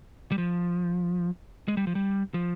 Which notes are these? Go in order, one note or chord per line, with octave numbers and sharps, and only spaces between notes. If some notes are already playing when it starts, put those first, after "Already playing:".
G3
F3
G#3
G3
F3
G3
F3